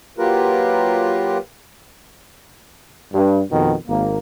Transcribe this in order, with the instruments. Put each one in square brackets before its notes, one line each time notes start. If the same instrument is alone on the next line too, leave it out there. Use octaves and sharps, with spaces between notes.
[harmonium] F#3 A#3 F4 G4 A#4 B4
[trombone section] G2
F2 B2 D#3
G#1 A#3